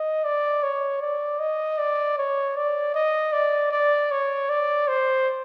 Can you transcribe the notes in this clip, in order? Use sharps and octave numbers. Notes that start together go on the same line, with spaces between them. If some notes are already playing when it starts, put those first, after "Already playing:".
Already playing: D#5
D5
C#5
D5
D#5
D5
C#5
D5
D#5
D5
D5
C#5
D5
C5